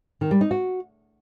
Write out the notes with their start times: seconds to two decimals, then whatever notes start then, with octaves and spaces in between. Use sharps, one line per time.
0.21 D#3
0.31 G3
0.41 D#4
0.51 F#4